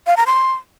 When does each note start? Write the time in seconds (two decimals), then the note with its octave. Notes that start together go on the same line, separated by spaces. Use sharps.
0.07 F5
0.17 A#5
0.27 C6